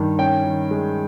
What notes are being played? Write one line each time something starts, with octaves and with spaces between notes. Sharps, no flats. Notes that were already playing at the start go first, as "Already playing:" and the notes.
Already playing: G2 D#3
C#4 G5
D#3
G#3